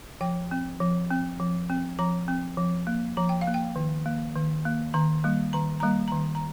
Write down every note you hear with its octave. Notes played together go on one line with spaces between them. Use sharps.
F3 G5
C4
F3
C4
F3
C4
F3 A#5
C4
F3
A#3
F3 A#5
G5
F5
A#3
G5
D#3
A#3
D#3
A#3
D#3 A#5
G3 A#3
D#3 A#5
G3 A#3 A#5
D#3 A#5
A#5